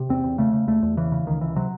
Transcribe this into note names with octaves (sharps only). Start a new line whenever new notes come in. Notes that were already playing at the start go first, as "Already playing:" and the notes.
Already playing: C3
E2 C4
E2
C#3 A3
C#3
E2 A3
E2
C#3 E3
C#3
C#2 D#3
C#2 E3
C3 F#3